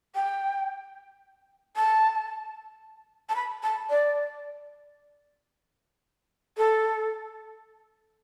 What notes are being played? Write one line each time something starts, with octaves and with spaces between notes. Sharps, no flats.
G5
A5
A5
B5
A5
D5
A4